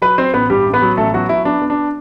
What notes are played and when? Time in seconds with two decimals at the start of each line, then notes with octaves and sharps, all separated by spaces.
0.02 F#3 B4 B5
0.18 F#3 C4 C5
0.34 A1 B3 B4
0.50 G2 G3 G4
0.66 A1
0.74 B3 B4
0.82 F#3
0.97 A1 A3 A4
1.14 F#3 B3 F#4
1.29 F#3 E4
1.45 B3 D4
1.62 B3
1.70 D4